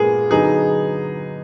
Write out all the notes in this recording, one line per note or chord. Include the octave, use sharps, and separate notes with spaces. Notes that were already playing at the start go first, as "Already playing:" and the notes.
Already playing: A#2 F3 G#3 B3 G#4 A#4
D3 F#3 B3 D#4 G#4